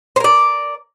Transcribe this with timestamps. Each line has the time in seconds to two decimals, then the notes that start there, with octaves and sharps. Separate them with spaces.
0.16 C5
0.20 A#4
0.24 D5